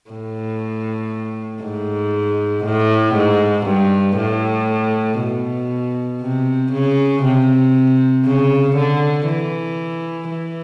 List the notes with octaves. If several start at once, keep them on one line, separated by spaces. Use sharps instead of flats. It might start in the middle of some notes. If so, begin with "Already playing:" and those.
A2
G#2
A2
G#2
G2
A2
B2
C3
C#3
C3
C#3
D3
E3
E3